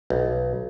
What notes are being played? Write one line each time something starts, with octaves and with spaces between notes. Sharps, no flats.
B1